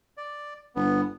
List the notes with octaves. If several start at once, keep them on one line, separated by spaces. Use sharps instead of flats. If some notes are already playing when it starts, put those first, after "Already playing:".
D5
G1 B3